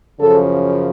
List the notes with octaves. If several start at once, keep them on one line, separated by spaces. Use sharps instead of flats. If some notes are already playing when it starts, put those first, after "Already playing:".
F#2 C#3 F3 A4